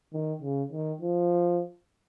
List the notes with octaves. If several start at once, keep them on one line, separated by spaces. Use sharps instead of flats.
D#3
C#3
D#3
F3